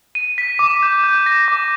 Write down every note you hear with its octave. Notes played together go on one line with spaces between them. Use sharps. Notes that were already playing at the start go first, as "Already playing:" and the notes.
D#7
B6
D6
G6
G6
A#6
D6